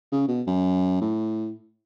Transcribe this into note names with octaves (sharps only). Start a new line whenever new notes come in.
C#3
B2
F#2
A2